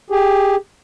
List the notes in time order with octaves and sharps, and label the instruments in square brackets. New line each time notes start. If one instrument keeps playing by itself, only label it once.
[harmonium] G4 G#4